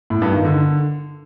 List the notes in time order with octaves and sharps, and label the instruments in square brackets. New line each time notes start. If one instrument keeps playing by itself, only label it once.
[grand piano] A2
G2
D#3
D3